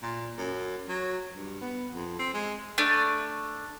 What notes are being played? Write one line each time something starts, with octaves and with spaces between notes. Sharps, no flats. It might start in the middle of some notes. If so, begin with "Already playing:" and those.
A#2
F#2
F#3
G2
B3
F2
C4
G#3
A3 D4